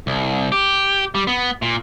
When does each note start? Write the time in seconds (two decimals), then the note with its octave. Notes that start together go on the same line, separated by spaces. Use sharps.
0.07 C2
0.52 G4
1.15 G3
1.27 B3
1.62 A#2